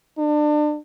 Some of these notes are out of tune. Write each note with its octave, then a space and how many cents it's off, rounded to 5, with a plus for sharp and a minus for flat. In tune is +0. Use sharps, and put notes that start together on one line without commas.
D4 +30